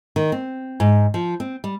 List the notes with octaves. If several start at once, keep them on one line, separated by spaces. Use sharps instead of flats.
D#3
C4
G#2
F3
C4
G3